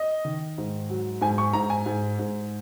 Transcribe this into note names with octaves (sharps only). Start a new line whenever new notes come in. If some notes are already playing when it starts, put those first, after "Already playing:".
Already playing: D#5
D#3
G#2
F#3
G#2 G#5
C#6
G#2 A#5
G#5
G#2
G#2